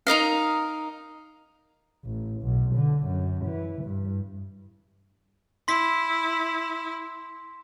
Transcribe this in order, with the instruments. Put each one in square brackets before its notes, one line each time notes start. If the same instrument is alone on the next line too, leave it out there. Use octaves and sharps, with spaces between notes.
[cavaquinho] D#4 A#4 D#5 F5
[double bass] A1
B1
D3
F#2
E3
G2
[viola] E4 [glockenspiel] C6 B6